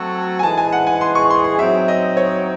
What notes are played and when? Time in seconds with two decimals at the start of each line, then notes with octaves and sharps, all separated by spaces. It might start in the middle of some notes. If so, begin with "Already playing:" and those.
Already playing: F#3 A3 C4 F#4 A4
0.39 G#5
0.43 E3 G#3 D#4 G#4 A5
0.58 G#5
0.72 F#5
0.87 G#5
1.01 C6
1.15 C#6
1.30 C6
1.44 C6
1.59 F#3 C4 D#4 E5
1.88 D#5
2.17 C#5